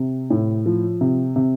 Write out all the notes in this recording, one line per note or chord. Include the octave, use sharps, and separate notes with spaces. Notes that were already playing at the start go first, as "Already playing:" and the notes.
Already playing: C3
A2
F3
C3
C3